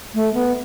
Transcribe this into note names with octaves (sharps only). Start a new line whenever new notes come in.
A3
B3